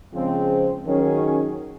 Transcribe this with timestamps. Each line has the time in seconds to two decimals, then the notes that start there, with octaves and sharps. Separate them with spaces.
0.12 C#3 F3 G#3 C4
0.83 D#3 F#3 C#4 G#4